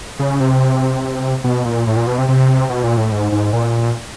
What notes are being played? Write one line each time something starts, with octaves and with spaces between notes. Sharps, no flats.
C#3
C3
B2
A#2
A2
A#2
B2
C3
C3
B2
A#2
A2
G#2
G#2
A#2